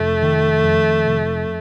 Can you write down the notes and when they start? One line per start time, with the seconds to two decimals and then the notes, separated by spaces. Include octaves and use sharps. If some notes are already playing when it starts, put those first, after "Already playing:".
Already playing: F1 A3
0.22 D#3
0.64 F2
1.06 F1